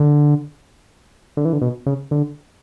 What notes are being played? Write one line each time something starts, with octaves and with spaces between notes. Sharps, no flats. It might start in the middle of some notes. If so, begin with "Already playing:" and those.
Already playing: D3
D3
E3
D3
B2
C#3
D3